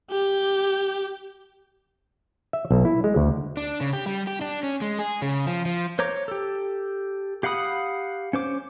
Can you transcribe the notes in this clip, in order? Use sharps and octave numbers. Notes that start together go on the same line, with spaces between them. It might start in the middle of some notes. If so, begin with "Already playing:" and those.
G4
E5
B1
E4
G#3
D2
D4
C#3
G4
G3
G4
D4
C#4
G#3
G#4
C#3
F3
F3
C5 C#5 A#5 D6
G4 A4
G4 F5 F#5 B5 D#6
C#4 C5 D6